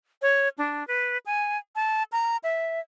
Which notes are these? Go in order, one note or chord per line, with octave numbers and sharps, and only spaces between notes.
C#5
D4
B4
G#5
A5
A#5
E5